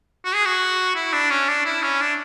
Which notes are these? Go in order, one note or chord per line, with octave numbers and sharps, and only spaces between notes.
F#4
G#4
F#4
E4
D4
C#4
D4
E4
C#4
D4